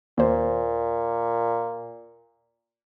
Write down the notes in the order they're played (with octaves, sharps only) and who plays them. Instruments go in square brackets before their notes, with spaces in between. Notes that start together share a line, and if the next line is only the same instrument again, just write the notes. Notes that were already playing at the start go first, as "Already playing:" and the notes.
[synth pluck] D#2 C5 [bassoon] A#2